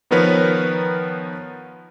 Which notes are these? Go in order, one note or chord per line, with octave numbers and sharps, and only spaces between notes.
D#3 F3 B3 A#4 B4 C#5